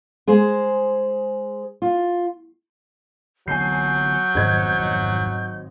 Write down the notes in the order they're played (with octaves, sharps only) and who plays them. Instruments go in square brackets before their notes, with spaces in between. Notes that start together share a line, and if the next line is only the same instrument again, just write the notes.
[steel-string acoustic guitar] G#3 G#4 C5
F4
[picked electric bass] D3 E3 B3 [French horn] F#3 [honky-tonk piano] G#5 A5 C7 [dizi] G6
[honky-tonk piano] G#1 D#5 G#6 [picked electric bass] F2 B2 D#3